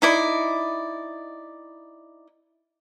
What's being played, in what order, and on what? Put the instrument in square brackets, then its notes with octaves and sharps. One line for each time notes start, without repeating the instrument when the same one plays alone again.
[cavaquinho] D#4 E4 D5